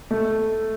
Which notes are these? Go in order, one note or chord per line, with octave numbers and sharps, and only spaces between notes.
A3